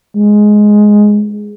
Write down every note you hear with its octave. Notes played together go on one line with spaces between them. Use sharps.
G#3